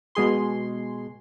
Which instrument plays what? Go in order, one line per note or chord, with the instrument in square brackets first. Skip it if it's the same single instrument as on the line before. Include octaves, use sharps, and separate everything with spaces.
[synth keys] B2 G#3 G#4 C6